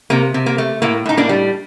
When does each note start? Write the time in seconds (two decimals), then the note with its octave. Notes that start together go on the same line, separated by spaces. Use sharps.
0.10 C3 A#3
0.34 C3
0.46 A#3
0.58 A3
0.82 A2 A#3
1.06 A2 D#4
1.17 A#3 D4
1.29 G3